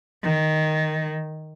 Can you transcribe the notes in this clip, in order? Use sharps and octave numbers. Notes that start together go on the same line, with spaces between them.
D#3